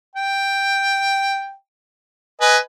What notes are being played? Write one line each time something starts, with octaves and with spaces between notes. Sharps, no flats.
G5
B4 D#5 G#5